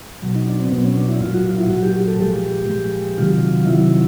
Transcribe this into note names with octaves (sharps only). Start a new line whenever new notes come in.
B2 F#3
D#4
D4
C4
B2 F#3 B3
C#4
D4
E4
A#2 F#3 F4
F#4
F4
E4
A#2 F#3 F#4
G4
A4
A#2 F3 G#3 G4
A#2 F3 G#3
C3 D#3 F#3 F4
C3 D#3 F#3 E4